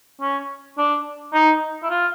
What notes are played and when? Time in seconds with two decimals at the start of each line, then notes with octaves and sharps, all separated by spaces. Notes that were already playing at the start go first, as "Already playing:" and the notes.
0.21 C#4
0.78 D4
1.34 D#4
1.83 E4
1.90 F4